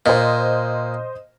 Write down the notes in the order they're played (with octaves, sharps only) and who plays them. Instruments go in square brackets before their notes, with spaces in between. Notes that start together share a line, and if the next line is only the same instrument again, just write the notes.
[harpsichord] A#2 [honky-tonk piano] C5 D#5